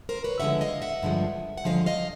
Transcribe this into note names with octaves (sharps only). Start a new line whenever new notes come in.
A#4 C5
B4 C#5
G2 D3 F3 G#3 E5 F#5
D#5 F5
E5 F#5
G2 D3 F3 G#3
F#5
G2 D3 F3 G#3 D#5 F5
D#5 F5